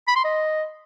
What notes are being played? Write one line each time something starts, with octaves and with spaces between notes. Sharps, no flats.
B5
C6
D#5